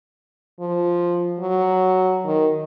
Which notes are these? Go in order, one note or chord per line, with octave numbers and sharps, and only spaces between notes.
F3
F#3
D#3